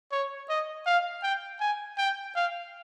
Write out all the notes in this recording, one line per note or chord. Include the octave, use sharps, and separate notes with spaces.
C#5
D#5
F5
G5
G#5
G5
F5